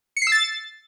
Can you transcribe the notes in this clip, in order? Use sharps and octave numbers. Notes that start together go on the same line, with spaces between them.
C#7
C7
E6
A6